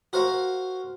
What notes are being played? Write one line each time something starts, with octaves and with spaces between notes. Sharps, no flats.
F#4 A#4 C5 F5